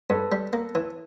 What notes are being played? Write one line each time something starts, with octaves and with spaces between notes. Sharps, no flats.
G2 A4 B4
G3
A#3
E3